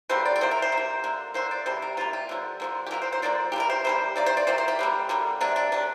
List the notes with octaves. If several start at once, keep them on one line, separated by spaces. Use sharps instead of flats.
D3 G3 A#3 C5
D5
D5
C3 A#3 C5
A#4
C5
C3
A#3
D3 A#3
D3 A#3 C5
D5
C3 G3 C5
A#4
C3 G3 A#3 F4
G4
D3 F3 A#3
D3 F3 A#3
G4
D3 F3 A#3 A#4
C5
C5
D3 F3 A#3 D5
A#3 G4
C3 G3 A#4
C5
C3 G3 A#3 C5
C3 A#3 D5
C5
D5
C3 A#3 C5
C5
G4
D3 G3 A#3
D3 G3 A#3
C3 A#3 D4
D4
C3 A#3 D4